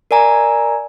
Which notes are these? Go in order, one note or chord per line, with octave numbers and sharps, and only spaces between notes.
A#4 D5 G#5 A#5